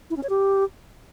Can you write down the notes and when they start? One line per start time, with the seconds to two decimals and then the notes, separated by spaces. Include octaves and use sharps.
0.10 E4
0.17 C#4
0.23 C#5
0.29 G4